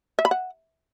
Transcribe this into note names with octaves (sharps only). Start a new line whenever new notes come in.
E5
B5
F#5